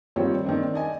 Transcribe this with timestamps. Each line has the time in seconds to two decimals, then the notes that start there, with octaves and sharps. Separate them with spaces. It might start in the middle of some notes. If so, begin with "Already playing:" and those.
0.16 D#3 F3 G3 C4 C#5
0.44 D#3 C4 D4
0.74 D5 D#5 G#5